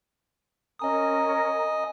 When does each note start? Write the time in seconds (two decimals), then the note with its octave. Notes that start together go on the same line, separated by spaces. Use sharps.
0.79 C#4 A#4 D#5 G#5 A#5 D#6